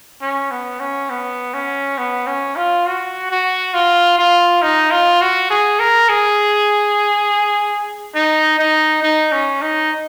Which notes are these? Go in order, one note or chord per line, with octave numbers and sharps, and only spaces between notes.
C#4
B3
C#4
B3
C#4
B3
C#4
F4
F#4
F#4
F4
F4
D#4
F4
F#4
G#4
A#4
G#4
D#4
D#4
D#4
C#4
D#4